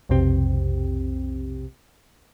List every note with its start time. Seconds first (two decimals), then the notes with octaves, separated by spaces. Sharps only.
0.09 B1 F2 C3 C4 G4